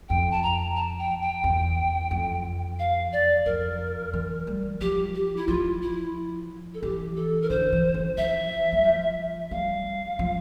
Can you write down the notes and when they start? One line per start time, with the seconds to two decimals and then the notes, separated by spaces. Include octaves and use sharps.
0.09 F2 G5
0.31 A5
0.43 A#5
0.76 A5
0.99 G5
1.21 G5
1.44 E2
2.11 F2
2.79 F5
3.13 D5
3.45 F2 A#4
4.13 E3
4.47 G3
4.81 F3 G4
5.14 G4
5.36 E4
5.47 F3 F4
5.82 E4
6.74 A4
6.83 E3 G4
7.16 A4
7.42 A#4
7.49 D3 C5
7.72 E3
7.94 E3
8.18 F3 E5
8.73 G3
8.85 F3
9.51 G3 F5
10.19 F3